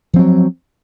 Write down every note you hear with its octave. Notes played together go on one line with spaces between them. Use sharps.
F3 F#3 C4